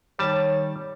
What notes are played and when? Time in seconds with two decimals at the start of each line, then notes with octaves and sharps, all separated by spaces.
0.19 D#3 G3 C#5 A5